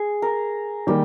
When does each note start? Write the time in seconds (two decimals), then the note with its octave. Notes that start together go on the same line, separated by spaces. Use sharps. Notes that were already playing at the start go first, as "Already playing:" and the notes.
Already playing: G#4
0.22 A#4
0.87 D#3 G3 A#3 G4